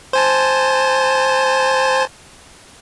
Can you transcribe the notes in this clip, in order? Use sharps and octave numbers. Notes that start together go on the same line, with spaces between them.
C5 G#5 A5